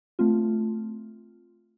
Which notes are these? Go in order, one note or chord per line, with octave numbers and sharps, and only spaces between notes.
A3 C4 F4